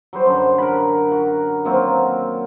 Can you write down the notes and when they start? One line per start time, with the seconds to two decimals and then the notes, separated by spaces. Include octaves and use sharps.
0.13 F#3 G3 C5
0.26 F#2 D3
0.58 A#4 F#5 B5
1.12 F#4
1.65 D#3 F#3 A#3 C4